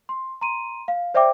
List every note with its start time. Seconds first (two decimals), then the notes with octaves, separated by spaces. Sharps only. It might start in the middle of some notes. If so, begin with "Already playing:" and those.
0.09 C6
0.41 A#5 C6 D#7
0.88 F5
1.14 C5 D5 E5 G5 D6